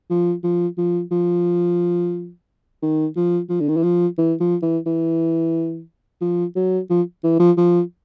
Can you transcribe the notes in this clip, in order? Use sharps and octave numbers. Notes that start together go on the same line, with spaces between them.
F3
F3
F3
F3
D#3
F3
F3
D3
D#3
E3
F3
E3
F3
E3
E3
F3
F#3
F3
E3
F3
F3